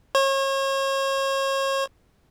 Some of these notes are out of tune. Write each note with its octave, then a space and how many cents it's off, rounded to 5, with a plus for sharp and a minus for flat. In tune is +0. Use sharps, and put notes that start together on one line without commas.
C#5 -35